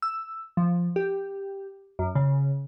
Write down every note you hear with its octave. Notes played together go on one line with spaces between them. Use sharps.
E6
F3
G4
F#2
C#3